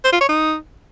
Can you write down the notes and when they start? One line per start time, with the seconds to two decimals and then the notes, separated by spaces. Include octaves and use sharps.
0.04 C5
0.12 F4
0.21 C#5
0.29 D#4